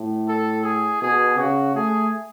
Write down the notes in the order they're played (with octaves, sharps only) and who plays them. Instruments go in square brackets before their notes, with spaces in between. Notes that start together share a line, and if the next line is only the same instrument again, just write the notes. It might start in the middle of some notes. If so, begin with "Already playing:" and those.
Already playing: [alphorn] A2
[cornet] A4
G#4
[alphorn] B2 [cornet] G#4
[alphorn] C#3 [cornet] F#4
[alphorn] A3 [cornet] G#4